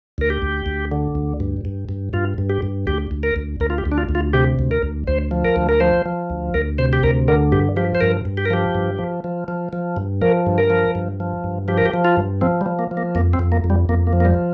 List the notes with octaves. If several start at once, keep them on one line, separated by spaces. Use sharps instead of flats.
D2 A#4
G4
D2
D2
D3
D2
G2
G2
G2
G2 F4
G2
G4
G2
D2 G4
D2
A#4
D2
D2 A#4
F4
G4
D2
D4
F4
D2
F4
C3 G4
D2
A#4
D2
D2 C5
F3
A#4
D2
A#4
F3 C5
F3
D2
D2 A#4
C3 C5
G4
D2 A#4
D3 A#4
G2 G4
F3 G4
C5
G2 A#4
G2
G4
A#4
F3 G4
G2
F3
F3
F3
F3
G2
F3 A#4
G2
A#4
F3
G2
F3
G2
F3 G4
A#4
G4
F3
F4
G2
F3 C4
G3
F3
A#3
F3
A#3
F2 A#3
C4
F2
A#3
F2
G3
F2 A#3
A#3
F3
A#3
G3